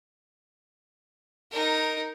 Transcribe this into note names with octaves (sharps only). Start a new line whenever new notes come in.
D#4 A#4